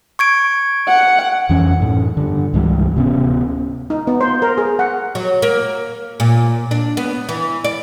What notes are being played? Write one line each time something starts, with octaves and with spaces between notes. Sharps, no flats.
C#6 G#6 D7
F#5
F2 E3 C#4
F#2 A2
G2 D3
C#2 G#2 E3 G3
D1 C3 B3 C#4
D#4
B3
C5
A#4
G#4
F#5
F#3
A#3
A#2
D4
B3
E3
D5